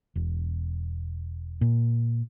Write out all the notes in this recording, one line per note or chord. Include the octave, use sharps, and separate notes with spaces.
E1
A#2